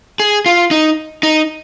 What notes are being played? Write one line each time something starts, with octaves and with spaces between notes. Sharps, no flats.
G#4
F4
D#4
D#4